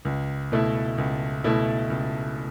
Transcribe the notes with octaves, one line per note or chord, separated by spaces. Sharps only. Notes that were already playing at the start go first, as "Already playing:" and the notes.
C#2
B2 A3 E4
C#2
B2 A3 E4
C#2